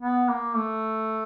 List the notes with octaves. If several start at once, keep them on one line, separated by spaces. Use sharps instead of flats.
B3
A#3
A3